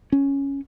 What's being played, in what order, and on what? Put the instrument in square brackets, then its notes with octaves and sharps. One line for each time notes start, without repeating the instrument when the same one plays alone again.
[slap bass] C#4